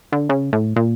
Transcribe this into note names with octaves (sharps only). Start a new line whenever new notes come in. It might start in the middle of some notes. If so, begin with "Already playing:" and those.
D3
C#3
A2
A#2